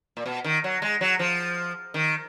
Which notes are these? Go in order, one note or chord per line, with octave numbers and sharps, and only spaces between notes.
A#2
B2
D#3
F#3
G#3
F#3
F3
D#3